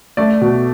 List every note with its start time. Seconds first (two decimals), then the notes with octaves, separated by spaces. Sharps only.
0.17 A3 D5
0.41 B2